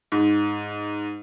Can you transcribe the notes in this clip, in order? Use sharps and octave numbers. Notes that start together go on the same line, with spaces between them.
G#2